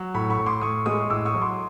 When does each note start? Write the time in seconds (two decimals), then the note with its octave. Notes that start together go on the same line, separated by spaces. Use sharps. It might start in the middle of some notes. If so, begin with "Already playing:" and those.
Already playing: F#3
0.14 A2 B5 C#6
0.30 B5 C#6
0.39 A2
0.46 C6 D6
0.61 A2 C#6 D#6
0.86 G#3 C#6 D#6
1.10 A2 D6 E6
1.25 C#6 D#6
1.34 F#3
1.41 C6 D6